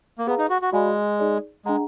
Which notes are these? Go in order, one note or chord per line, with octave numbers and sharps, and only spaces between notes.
A#3
B3 G#4 B4 F5 A#5
D#4
F#4
F#4
G#3 F#4 D5 F5 G#5 B5
D#4 G#4 D5
G#3 D4 G#4 D#5 F#5 A#5